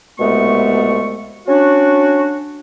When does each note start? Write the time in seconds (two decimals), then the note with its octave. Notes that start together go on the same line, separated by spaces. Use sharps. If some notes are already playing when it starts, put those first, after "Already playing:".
0.19 C2 B2 G#3 A3 B3 C#6
1.48 C#4 D4 F#4